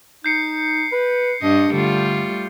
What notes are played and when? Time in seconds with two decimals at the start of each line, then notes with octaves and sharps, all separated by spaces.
0.24 D#4 G6 C7 C#7
0.92 B4
1.42 G2 D4 D#5
1.73 D3 G3 A3 F4